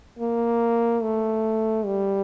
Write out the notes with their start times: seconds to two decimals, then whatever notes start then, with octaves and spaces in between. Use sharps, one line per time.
0.19 A#3
1.02 A3
1.85 G3